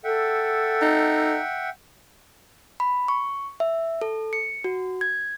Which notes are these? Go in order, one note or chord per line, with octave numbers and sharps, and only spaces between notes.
A4 E5 F#5 G5
D#4
B5
C#6
E5
A4
C#7
F#4
G#6